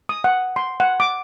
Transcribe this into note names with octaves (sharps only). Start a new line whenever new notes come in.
D#6
F#5
C6
F#5
D6